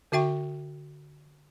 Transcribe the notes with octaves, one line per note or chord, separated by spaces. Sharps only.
D3 F#4 E5 G5 C#6